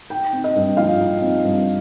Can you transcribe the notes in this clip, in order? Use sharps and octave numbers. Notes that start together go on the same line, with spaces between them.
D#4 G5
C4
D#5
G2
F3 F5
D#4
C4
G2